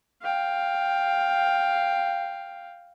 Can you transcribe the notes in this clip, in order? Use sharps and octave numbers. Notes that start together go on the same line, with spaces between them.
F5 G5